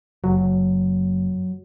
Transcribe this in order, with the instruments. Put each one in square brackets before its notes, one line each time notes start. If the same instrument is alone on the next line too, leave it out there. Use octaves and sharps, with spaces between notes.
[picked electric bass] F#1 [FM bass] F#3